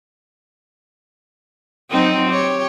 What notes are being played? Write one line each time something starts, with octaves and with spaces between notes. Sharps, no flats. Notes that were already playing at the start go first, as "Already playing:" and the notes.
F#3 C4 D#4
G4 C#5